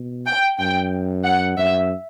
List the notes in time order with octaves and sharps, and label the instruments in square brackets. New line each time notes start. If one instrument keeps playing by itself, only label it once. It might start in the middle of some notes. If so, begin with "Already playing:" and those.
Already playing: [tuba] B2
[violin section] G5
[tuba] F#2 [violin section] G5
[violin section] F#5
[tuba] F#2 [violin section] E5